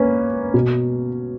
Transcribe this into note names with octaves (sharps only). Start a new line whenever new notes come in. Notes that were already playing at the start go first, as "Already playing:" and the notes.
Already playing: A#3 C#4 B4
B2